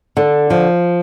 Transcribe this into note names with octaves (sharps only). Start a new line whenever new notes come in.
D3
F3